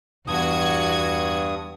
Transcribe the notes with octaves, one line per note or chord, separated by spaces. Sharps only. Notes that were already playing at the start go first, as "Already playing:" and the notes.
E2 G2 F#4 D#6 G#6